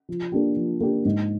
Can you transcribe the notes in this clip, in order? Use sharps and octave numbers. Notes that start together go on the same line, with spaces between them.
F3
A#3 D4 G4
F3
A#3 D4 G4
G#2